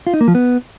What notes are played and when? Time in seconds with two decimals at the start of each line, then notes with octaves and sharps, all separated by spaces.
0.07 F4
0.14 D#4
0.21 A#3
0.28 F3
0.35 B3